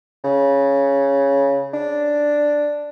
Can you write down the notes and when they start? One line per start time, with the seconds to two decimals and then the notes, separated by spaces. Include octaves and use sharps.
0.24 C#3
1.74 D4